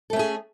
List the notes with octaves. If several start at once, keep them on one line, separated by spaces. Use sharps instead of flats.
A3 C#4 G#4 A4